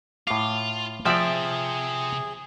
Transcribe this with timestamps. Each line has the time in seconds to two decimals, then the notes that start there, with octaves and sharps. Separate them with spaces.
0.27 A2 F4 F5 D6
1.06 C3 F3 C4 G#4 D5 E5 G5